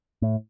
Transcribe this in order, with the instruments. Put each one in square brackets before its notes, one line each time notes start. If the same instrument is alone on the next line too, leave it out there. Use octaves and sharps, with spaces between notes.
[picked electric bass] A2